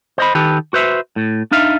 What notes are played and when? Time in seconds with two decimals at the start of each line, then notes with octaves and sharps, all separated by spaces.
0.18 C5 D#5 B5
0.35 D#3 G4 A4 B4
0.73 F#4 B4 C5 E5
1.16 A2
1.51 D4 D#4 E5 F5